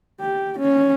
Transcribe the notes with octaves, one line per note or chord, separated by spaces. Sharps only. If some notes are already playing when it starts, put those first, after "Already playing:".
G4
C#4